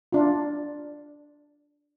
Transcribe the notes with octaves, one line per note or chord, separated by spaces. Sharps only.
D4 F4